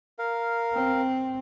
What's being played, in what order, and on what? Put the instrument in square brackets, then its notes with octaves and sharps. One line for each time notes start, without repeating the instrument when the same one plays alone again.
[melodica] A#4 F5
[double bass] C4